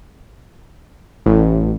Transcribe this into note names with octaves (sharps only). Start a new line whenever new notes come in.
A1